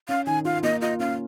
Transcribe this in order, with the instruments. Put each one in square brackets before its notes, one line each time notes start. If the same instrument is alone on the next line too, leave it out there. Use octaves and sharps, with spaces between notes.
[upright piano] C#4 [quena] F5
[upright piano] D#3 [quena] G#5
[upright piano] F4 [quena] F5
[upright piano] A#3 [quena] D#5
[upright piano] F4 [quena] D#5
[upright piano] C#4 [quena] F5